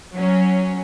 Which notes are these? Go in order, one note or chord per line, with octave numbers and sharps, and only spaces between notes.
F#3 C#4